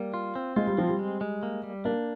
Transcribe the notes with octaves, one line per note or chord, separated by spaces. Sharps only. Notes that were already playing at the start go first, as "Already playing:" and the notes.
Already playing: G3 A#3
F4
C4
G#3 F4
G3
F3 C4
G3
G#3
G#3
A#3
G3
A#3 D4